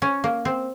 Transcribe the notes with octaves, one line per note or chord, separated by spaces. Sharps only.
C#4
A#3
C4